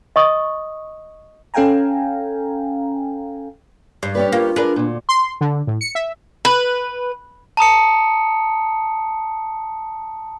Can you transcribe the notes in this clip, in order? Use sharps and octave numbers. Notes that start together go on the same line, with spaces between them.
D#5 C#6 D#6
C#4 A4 F5 G5 G#5 A#5
G2
C#4 G4 B4 D5
A#3 F4
D4 G#4 A#4 B4
D2 A#2
C6
D3
A2
C#7
E5
B4
A5 A#5 D#6 C#7